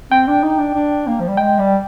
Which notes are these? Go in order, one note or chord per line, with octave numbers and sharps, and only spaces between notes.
C4 G5
D4
D#4
D4
D4
A#3
F3
G3
G#3 G5
G3